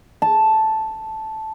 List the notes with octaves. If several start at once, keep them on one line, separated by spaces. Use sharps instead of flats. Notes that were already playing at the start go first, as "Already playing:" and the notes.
A5